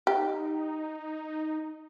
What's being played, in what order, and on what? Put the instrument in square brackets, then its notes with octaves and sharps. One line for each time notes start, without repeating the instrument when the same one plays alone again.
[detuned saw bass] D#4 [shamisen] G4